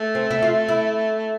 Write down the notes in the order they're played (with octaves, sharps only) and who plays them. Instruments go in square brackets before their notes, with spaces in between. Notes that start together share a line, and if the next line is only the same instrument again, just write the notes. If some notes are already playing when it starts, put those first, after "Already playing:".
Already playing: [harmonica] A3
[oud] C4
E4
F4
E4